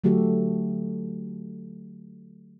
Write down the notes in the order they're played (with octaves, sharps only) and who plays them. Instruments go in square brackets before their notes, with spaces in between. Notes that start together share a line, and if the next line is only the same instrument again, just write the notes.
[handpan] D3 F#3 A3 F#4 G4 A4